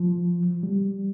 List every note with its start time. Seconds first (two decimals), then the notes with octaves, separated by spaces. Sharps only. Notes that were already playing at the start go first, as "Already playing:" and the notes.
Already playing: F3
0.63 G3